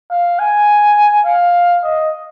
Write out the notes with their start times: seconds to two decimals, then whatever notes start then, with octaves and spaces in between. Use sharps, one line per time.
0.11 F5
0.39 G#5
1.25 F5
1.83 D#5